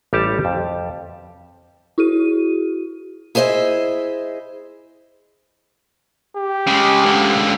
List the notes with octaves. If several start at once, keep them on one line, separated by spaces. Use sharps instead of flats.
A1 G3 G4 A4 A5
F2
E4 F#4 G#4 D#7
E4 G#4 C5 D#5 E5
G4
C#3 G#3
C#2 D3